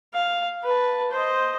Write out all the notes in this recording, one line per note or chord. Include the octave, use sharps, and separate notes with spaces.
F5
B4 A5
C5 D#5